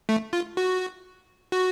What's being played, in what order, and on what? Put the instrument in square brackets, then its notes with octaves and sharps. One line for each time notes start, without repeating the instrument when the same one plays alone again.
[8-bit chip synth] A3
F4
F#4
F#4